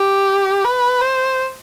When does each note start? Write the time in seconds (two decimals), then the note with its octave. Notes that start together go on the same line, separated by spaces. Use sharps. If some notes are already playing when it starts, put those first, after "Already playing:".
Already playing: G4
0.65 B4
1.01 C5